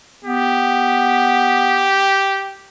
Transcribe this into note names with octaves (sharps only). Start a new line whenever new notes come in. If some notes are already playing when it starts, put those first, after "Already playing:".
B3 G4